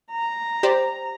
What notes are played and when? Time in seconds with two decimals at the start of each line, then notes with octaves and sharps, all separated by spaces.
0.11 A#5
0.63 G4 C5 D5